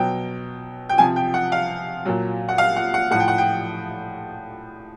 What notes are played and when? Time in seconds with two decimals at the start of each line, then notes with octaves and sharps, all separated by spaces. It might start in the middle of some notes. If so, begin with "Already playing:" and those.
Already playing: B2 F#3 G5
0.89 G5
0.98 C3 F3 G#5
1.16 G5
1.34 F#5
1.52 F5
2.05 A#2 F#3
2.49 F#5
2.58 F5
2.76 F#5
2.94 F#5
3.11 A2 F3 F#5
3.20 G5
3.28 F#5
3.38 G5